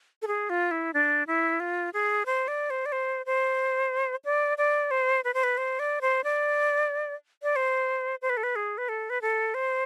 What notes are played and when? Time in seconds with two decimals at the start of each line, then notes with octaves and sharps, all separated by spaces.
0.22 A4
0.27 G#4
0.50 F4
0.71 E4
0.94 D4
1.27 E4
1.60 F4
1.93 G#4
2.26 C5
2.48 D5
2.70 C5
2.86 D5
2.92 C5
3.26 C5
4.25 D5
4.58 D5
4.91 C5
5.24 B4
5.34 C5
5.43 B4
5.57 C5
5.79 D5
6.01 C5
6.24 D5
7.43 D5
7.56 C5
8.22 C5
8.30 B4
8.37 A4
8.43 B4
8.56 G#4
8.78 B4
8.89 A4
9.10 B4
9.22 A4
9.54 C5